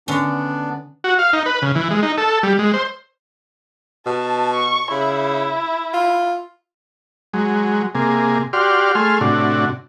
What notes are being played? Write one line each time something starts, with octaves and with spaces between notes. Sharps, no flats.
D3 B3 C#4 D4
F#4
F5
D#4
B4
C#3
E3
G#3
D#4
A4
G3
G#3
C5
B2 A5
C#6
C#3 E4
F4
F#3 G#3
C3 A#3 G#4
F#4 G4 D5 C6 F6
A3 G#4 C6 F6
A2 C3 D4 F#4